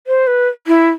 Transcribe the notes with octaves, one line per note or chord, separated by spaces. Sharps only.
C5
B4
E4